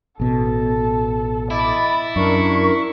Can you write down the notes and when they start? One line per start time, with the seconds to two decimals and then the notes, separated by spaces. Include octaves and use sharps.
0.20 A1 B2 A4
1.51 E4 D#5 B5 D6 A6
2.16 F#2 D4 A#4 C#6